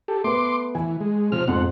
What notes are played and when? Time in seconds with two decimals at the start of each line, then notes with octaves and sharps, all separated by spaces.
0.08 G4 A4
0.24 A3 B3 C6 D6
0.75 E3 G#5
1.00 G#3
1.32 C3 F3 F6
1.48 F2 G#2 F#5 C6